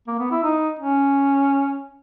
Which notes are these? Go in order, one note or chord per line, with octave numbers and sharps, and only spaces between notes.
A#3
B3
E4
D#4
C#4